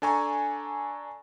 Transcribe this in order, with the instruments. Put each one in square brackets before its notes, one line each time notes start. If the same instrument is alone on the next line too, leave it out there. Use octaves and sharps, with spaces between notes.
[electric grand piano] D4 A4 G#5 A#5 C#6